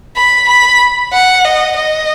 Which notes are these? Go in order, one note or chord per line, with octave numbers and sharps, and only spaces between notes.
B5
B5
F#5
D#5
D#5